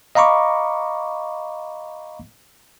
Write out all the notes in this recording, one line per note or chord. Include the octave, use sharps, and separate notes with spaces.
D#5 F5 A#5 B5 C#6 D6